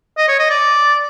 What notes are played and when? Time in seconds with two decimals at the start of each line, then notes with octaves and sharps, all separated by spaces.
0.18 D#5
0.28 C#5
0.39 D#5
0.50 D5